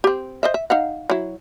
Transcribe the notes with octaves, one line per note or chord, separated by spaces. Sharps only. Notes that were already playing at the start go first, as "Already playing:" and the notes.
C4 G4
C5 D#5 E5
E5
D#4 F5 F#5
F#3 E4